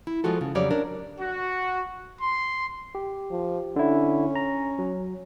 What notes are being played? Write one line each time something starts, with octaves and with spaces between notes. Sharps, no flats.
E4
F3 G#3 F4 F#4 A4
C#3
F2 C#3 F#3 G3 C#5 D5
C#4 D4 A#4
F#4
C6
G4
F3
D3 C#4 E4
A#5
F#3